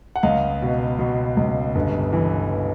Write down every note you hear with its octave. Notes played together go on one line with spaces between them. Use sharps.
F#5
C#2 D#5 F5
B2
B2
C#2
G1
E3